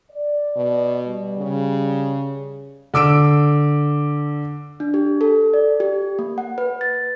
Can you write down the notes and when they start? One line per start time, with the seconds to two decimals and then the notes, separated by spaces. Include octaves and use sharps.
0.11 D5
0.56 B2
1.07 G3
1.38 C#3
2.94 D3 D6 E6 D7
4.80 D4
4.94 G4
5.21 A4
5.54 D5
5.80 G4
6.19 A#3
6.38 F#5
6.58 B4
6.81 A6